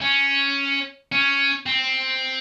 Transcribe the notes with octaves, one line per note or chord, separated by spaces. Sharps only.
C#4
C#4
C4